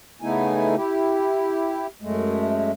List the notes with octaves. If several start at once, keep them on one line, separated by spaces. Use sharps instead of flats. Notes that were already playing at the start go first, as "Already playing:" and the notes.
C#3 A3 B3 D#4 E4 G#5
E4 G4
F#2 G#3 A3